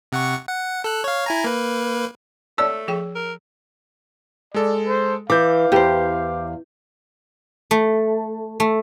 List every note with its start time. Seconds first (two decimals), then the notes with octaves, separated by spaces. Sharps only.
0.12 C3 F#5 C#6
0.49 F#5
0.84 A4 F#6
1.04 C#5 F5
1.26 E4 G#5 A#5
1.44 A#3 B4
2.58 A3 C#5 D5 A5 E6
2.88 F3 G#4 G5
3.15 A#4
4.54 G#3 A4 D5
4.88 C5
5.30 E3 F5 D6 G6
5.72 E2 G4 C5
7.71 A3
8.60 A3